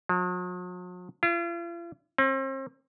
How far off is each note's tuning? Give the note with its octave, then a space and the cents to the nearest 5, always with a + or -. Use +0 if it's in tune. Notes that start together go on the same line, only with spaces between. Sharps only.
F#3 -45
F4 -40
C4 +40